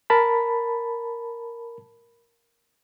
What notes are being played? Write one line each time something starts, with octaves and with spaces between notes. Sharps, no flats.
A#4 A5 B5